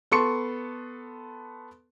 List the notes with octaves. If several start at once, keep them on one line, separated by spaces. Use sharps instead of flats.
B3 A4 C6 C#6 C#7